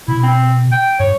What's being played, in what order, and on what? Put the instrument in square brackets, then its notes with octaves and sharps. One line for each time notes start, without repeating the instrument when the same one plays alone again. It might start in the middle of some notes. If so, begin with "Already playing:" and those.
[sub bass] B2 [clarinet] E4
[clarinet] C4
G5
[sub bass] G2 [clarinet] C#5